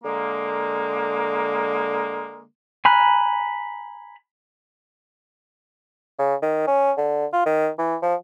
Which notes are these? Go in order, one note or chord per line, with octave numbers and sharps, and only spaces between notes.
D3 G#3 A#3
G#5 A#5 B5 F6 F#6
C#3
D#3
C#4
D3
F4
D#3
E3
F3